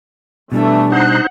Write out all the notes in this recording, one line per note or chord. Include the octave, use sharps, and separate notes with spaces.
B2 E3 G3 A3 D4
D#4 C5 F#5 F#6